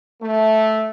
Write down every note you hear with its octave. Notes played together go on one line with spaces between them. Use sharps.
A3